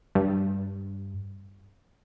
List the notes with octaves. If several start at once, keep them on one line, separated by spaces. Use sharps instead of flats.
G2